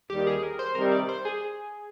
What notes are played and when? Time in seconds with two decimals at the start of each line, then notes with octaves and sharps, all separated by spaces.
0.10 D#2 D#3 G3 G4
0.27 G#4
0.43 A#4
0.59 C5
0.75 C3 D#3 G3 A#4
0.92 D5
1.09 C5
1.25 G#4